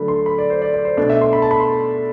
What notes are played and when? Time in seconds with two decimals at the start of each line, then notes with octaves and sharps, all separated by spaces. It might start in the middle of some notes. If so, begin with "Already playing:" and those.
Already playing: D3 F#3 A3 D4 B5
0.08 C6
0.26 B5
0.38 D5
0.50 C5
0.62 D5
0.74 D5
0.85 C5
0.97 B2 A3 D4 D5
1.10 E5
1.21 C6
1.33 B5
1.42 A5
1.51 B5
1.60 C6